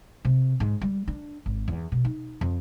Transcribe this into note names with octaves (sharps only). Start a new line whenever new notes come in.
C3
G#2
G3
D4
G#1
E2
B2
D#4
F2